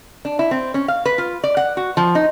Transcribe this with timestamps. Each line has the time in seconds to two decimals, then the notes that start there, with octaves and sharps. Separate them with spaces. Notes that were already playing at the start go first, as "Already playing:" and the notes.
0.25 D4
0.39 E4
0.51 C4
0.74 C#4
0.88 F5
1.06 B4
1.18 F4
1.44 D5
1.57 F#5
1.77 F#4
1.97 F3
2.15 D#4